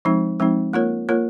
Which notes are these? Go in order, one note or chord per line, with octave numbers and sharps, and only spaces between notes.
F3 G#3 C4 D#4
F3 G#3 C4 D#4
A#3 F4 A#4 C#5
A#3 F4 A#4 C#5